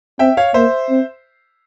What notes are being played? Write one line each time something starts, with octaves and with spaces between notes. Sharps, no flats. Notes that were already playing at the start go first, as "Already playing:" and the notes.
C4 E5 G5
C#5 F5
A#3 C5 E5
C4